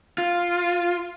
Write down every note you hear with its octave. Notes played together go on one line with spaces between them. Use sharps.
F4